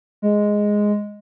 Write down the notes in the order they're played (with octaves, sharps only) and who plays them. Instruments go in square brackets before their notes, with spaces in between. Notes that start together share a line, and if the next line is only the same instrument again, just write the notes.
[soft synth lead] G#3